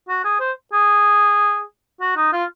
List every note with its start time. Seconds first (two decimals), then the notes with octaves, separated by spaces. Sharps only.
0.09 F#4
0.24 G#4
0.40 C5
0.73 G#4
2.01 F#4
2.17 D#4
2.33 F4